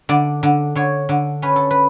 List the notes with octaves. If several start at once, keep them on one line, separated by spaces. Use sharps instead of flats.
D3 D5
D3
D3 C#5
D3
C#4 B4
A4
B4